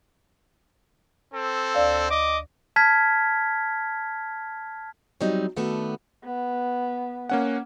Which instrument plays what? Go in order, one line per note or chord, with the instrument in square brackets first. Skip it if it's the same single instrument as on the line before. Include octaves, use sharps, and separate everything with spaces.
[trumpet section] C4 A4
[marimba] D2 D5 F5
[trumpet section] D#5 D6
[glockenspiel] A5 F6 G#6 B6
[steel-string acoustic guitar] F#3 G3 C4 D#4
D#3 A3 B3 D4 F#4 A4
[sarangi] B3
[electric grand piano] A#3 C#4 F#5